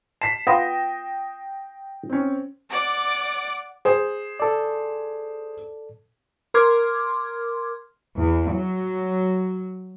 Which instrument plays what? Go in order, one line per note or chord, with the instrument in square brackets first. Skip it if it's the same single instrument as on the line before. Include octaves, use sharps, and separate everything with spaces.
[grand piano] A5 B6 [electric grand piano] C7 E7
[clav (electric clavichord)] B3 F4 [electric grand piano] G5 A#6 [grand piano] D#6
[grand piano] C4 C#4
[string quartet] D5 F#5 D6
[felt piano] G#4 C5
[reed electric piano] A4 D5
[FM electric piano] A#4 C6 D6 F6 G#6
[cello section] E2
F#3